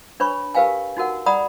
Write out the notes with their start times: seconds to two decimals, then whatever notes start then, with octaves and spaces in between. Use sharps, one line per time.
0.20 D4 B4 C#5 B5 C#6
0.54 G4 A#4 B4 F5 G5 G#5
0.97 D#4 F#4 A#4 F#5
1.26 D5 F#5 A#5 B5 D#6